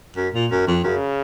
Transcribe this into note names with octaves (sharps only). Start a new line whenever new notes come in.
F#2
A#2
F#2
F2
F#2 C#3